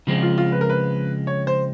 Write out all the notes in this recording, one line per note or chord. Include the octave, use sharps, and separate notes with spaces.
C#3 F3 G#3 C4
F4
F4
B4
A#4
B4
C#5
C5